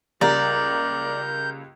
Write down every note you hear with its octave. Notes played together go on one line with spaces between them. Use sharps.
C#2 G3 A#3 A#4 D5 A#5 G6